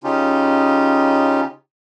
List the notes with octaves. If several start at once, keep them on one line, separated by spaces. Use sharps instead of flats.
C#3 C#4 D#4 F4 G4